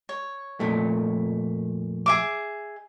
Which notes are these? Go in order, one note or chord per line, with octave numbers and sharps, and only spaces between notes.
C#5
F2 A#2 A3
G#4 E5 D6